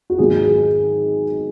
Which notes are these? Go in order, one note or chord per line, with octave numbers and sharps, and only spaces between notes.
F#4
G#2 D#3 F#3 B3 G#4
G#4